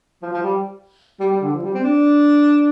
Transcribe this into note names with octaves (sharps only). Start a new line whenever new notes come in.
F3
F3
G3
G3
G3
D3
F3
G3
C4
D4